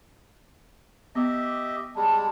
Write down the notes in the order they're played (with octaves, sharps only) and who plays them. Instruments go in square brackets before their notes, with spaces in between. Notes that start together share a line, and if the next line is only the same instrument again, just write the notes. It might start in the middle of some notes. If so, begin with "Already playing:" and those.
[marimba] B3 [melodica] G4 D#5 E5
[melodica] G3 G#3 [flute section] A5